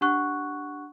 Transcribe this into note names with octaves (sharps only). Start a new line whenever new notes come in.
D4 G4 F#5 C#6 F#6